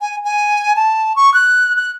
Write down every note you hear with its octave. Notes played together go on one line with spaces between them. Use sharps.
G#5
G#5
A5
C#6
F#6
F#6